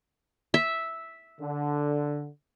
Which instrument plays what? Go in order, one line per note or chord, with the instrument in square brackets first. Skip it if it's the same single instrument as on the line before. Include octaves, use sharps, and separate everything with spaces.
[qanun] E5
[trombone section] D3